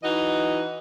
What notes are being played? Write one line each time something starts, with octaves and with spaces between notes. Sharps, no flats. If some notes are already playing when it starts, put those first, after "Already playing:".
E3 D#4 F#4 D#5